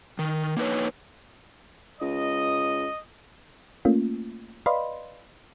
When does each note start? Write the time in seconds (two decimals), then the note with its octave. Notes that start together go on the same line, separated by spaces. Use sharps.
0.19 D#3
0.57 A#3 D#4 B4 C#5
2.01 C#2 D#5
3.85 A3 A#3 C#4 F4
4.66 B4 D5 D#5 F5 B5 C6